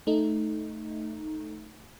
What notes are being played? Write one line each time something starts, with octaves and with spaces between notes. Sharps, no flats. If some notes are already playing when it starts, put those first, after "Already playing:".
A3 D#4